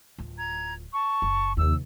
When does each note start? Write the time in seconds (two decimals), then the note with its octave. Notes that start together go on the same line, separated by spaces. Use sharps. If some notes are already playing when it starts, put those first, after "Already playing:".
0.19 D1 F4
0.38 A#5 G#6
0.93 A5 C#6
1.22 F#1
1.57 D#2 C3 F3 E6